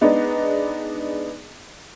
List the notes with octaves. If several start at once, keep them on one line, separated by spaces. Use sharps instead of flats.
G#3 B3 D4 D#4